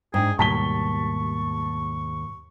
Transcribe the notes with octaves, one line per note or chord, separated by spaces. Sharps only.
G#2 D4 G#4 G5
D#2 G#2 B2 G3 A5 C#6 B6 G7